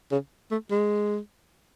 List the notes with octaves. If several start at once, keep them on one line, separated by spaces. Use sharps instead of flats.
C#3
A3
G#3